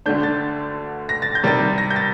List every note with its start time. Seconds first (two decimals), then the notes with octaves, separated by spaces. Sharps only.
0.06 D2 D3 A3 D4 G6
0.23 A6
1.09 A#6
1.22 A6
1.35 G6
1.43 C3 D#3 G3 A6
1.78 A#6
1.90 G6
1.96 A6